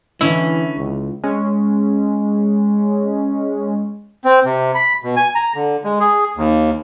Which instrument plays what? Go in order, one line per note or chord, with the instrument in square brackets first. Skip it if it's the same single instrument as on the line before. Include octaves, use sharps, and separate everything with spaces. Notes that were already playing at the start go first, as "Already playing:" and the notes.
[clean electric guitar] D3 C#4 [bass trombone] E3 [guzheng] E4
[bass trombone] C#2
[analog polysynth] G#3 C#4
[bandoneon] C4
C3
B5
B2
G#5
A#5
D3
G#3
G#4
D#2